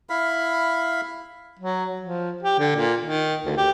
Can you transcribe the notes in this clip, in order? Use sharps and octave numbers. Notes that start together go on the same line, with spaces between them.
E4 F5 B5
F#3
F3
G4
D3
A#2
D#3
D2
G4